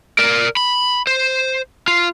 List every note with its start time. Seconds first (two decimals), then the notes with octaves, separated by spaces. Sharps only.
0.19 A#4 D5
0.57 B5
1.07 C5
1.88 F4